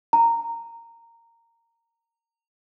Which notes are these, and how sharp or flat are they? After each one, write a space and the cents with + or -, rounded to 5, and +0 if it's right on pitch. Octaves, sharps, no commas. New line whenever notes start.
A#5 -15